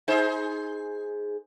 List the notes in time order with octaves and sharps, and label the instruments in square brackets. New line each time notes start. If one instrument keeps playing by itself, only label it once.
[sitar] D#4 G#4 C5